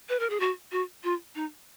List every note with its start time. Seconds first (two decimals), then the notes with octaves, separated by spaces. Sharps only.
0.09 B4
0.20 A#4
0.30 G#4
0.40 F#4
0.72 F#4
1.04 F4
1.35 D#4